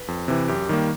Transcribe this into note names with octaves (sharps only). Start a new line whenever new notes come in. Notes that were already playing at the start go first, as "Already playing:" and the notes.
Already playing: B4
F2
C3 E3
F#2 G4
D#3 G3 A#3